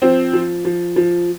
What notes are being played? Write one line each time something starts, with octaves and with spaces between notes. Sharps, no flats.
F3 C4
F3
F3
F3